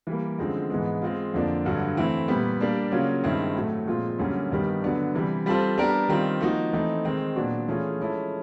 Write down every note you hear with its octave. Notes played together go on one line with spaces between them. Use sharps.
E3 G3 A#3
F#2 D3 F3 G#3 C4
G#2 E3 G#3 B3
G#3 C4 F4
F2 D3 F3 A#3 D4
G2 D3 F#3
E3 A3 C4 E4
A#2 G3 B3
G3 A#3 D4
C#3 F#3 A#3 C#4 F4
G2 D#3 G#3 C4 E4
A2 F#3 A3
A#2 F3 G#3 C4 F4
F#2 D3 G3 A#3 C#4
G2 D#3 G3 B3
D3 F#3 B3 D4
C3 E3 G3
G3 C4 F4 A4 C5
G3 B3 D4 G4 A#4
D#3 G3 C4 F4
F3 A#3 D#4 F#4
E3 A3 C4 D#4
D#3 G#3 C4
A#2 F#3 B3 D4 F#4
E3 A3 C#4 F4 G#4
F3 G#3 C#4 E4 A4